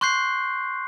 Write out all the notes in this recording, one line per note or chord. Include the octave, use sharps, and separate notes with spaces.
C6 C#6 F#6 G6 C7